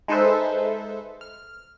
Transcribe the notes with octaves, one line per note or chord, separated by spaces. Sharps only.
G#3 D#4 A4 B4 C5 E5
F6